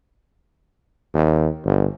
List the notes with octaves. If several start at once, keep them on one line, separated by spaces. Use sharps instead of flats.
D#2
G1